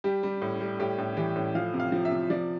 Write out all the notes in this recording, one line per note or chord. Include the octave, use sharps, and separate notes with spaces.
G3 G4
G3
A2
G3
A2 G4
A2
E3 G4
A2
F3 F5
C3
F5
F3
E5
C3
F3 D5